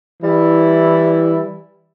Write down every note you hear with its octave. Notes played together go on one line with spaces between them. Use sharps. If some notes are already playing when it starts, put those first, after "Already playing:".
E3 G3 E4